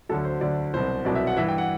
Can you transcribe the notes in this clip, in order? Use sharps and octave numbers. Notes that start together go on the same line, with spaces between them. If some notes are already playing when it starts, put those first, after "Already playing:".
D2 D3 F#3 A4
C5
D2 D3 F#3 D5
C2 B2 F#3 C5
C2 B2 F#3 D5
E5
F#5
G2 E3 E5
G5
F#5